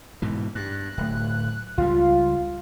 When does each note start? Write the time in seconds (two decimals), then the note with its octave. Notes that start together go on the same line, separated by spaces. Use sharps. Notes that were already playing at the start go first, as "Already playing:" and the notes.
0.22 G#2 B2 E3
0.55 G2 F#6
0.98 D1 A2
1.78 C#2 G3 F4